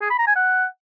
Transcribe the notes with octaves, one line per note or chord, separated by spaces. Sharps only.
G#4
B5
A#5
G#5
F#5